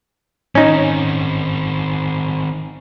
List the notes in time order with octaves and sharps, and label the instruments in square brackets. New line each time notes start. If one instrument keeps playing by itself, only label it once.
[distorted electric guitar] D#3 C4 [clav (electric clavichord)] C#4 D#4